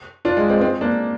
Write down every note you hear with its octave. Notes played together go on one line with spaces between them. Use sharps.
D4 F4
G#3
G#3 C4
G#3 C4
A#3 D4